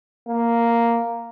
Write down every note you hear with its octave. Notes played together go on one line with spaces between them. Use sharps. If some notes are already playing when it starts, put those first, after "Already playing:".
A#3